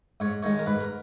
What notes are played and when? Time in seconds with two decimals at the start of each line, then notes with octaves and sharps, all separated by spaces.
0.20 G#2 C#5
0.43 D#3 G#3 C#5
0.59 A#4
0.66 G#2 B4
0.81 A#4